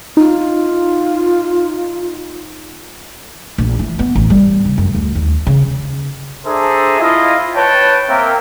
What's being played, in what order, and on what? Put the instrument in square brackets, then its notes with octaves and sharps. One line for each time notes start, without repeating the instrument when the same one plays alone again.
[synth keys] D#4 [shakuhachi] F4
[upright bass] A#1
E3
B3
A1
G3
C#2
F#2
D2
D#2
C#3
[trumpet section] D4 G#4 A4 C5 E5 A#5
E4 F4 D#5
B4 C#5 G5 A5
A#3 C4 A#4 E5 G5